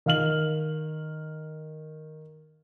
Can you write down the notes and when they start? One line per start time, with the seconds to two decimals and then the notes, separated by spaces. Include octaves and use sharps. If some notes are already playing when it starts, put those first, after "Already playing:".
0.06 D#3 F5 F6 F#7